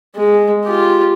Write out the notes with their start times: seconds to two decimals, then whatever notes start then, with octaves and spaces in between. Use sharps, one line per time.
0.16 G#3
0.65 F4 G4